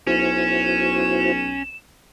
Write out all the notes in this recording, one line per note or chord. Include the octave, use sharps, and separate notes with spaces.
B1 C#4 E4 F#4 C5 E7